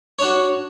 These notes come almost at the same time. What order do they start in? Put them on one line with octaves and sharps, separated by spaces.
C#5 D4 F#4